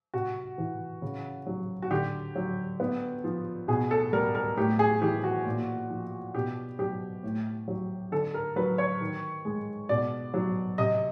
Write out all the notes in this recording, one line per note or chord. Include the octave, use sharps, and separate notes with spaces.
C3 F#4
E3
C#3
F#3
F#4
D3 G4
F#3
B3
F3
B2 G#4
A4
G3 A#4
A#4
A2 G4
G#4
E3 G4
F#4
A#2
F3
B2 G4
F#3 G4
A2
F#3
D3 A4
A#4
F#3 B4
C#5
D#3
G#3
B2 D5
F#3
C3 D#5